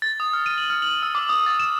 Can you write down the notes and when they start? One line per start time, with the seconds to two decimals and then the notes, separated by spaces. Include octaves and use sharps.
0.02 A6
0.20 D#6
0.33 F6
0.46 D#7
0.58 F#7
0.70 F6
0.82 F#7
1.03 E6
1.15 D6
1.29 D#6
1.46 A6
1.59 E7